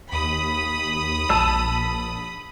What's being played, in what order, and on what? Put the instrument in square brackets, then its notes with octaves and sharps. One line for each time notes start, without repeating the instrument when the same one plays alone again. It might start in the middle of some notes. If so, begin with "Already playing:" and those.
[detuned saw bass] D#2 [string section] B5 D#6
[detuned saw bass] A#1 [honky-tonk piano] A5 E6 D#7